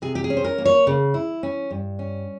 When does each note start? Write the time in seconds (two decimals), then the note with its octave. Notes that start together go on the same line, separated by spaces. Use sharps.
0.02 C3 G#4
0.15 G4
0.24 G#4
0.30 C#4
0.37 C5
0.44 A#4
0.58 A#3
0.65 C#5
0.87 C#3
1.14 E4
1.43 C#4
1.71 G2
1.99 C#4